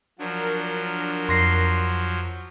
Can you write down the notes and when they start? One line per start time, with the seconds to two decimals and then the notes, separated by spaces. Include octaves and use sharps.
0.19 F3 F#3 D4 A#4
1.29 F2 C6 A#6 C7